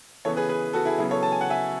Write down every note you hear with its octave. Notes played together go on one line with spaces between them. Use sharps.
C#3 E3 B3 A4 C#5
G#4 B4
G#4 B4
F#4 A4
E4 G#4
C#3 F#3 B3 E4
A4 C#5
A5
G#5
F#5
E5 G#5